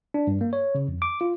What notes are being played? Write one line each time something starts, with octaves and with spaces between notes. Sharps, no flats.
D4
G2
A#3
C#5
C#3
F2
D6
F4